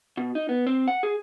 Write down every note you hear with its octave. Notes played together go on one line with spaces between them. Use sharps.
B2
D#4
B3
C4
F#5
G#4